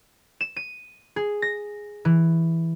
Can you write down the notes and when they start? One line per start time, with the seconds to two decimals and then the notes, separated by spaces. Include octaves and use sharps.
0.41 E7
0.56 D#7
1.16 G#4
1.42 A#6
2.05 E3